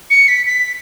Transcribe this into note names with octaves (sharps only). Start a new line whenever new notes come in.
C#7
B6
B6